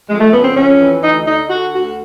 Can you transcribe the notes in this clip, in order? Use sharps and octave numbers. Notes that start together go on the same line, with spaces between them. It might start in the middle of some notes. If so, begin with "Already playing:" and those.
F2 G#3
A3
C#3 B3
C4
F2 C#4
E3
D2 D#4
D3 D#4
D3 F#4
D2 F#4